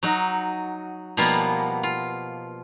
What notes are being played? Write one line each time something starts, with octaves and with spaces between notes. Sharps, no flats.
F#3 D#4 F#4
B2 F3 G3 A#3 B3
F4